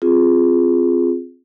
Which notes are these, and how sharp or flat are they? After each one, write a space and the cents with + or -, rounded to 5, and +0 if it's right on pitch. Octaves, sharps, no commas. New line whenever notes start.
C4 +0 F4 +0 G#4 +0